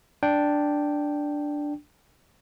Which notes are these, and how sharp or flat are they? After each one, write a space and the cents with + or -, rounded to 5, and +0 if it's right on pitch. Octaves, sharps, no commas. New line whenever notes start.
D4 +0 G5 +0